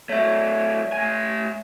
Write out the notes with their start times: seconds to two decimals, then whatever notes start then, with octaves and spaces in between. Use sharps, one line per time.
0.09 F#3 A3 C#5 E5
0.93 A3 G#5